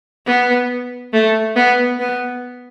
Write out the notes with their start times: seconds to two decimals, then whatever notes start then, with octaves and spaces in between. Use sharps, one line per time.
0.26 B3
1.13 A3
1.56 B3
2.00 B3